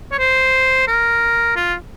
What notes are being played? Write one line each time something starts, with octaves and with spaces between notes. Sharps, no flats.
C#5
C5
A#4
F4